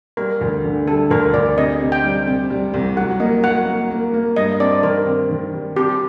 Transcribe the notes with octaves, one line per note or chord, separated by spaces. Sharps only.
G3 A#4
D2
D3
G3 A4
D2 A#4
D2 D5
C3 D#5
C3
G5
G3
C3
G3
C2
F#3 F#5
A#3 D#5
F#3 F#5
A#3
A#3
A#3
G2 D#5
C4 D5
D#3 A#4
C4
D#3
G3
C3 G4